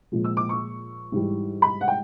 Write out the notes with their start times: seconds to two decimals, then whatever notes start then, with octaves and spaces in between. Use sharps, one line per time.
0.12 A#2 F3 G#3
0.24 E6
0.37 D6
0.49 C#6
1.12 G#2 E3 G3
1.62 B5
1.81 F#5
1.88 G5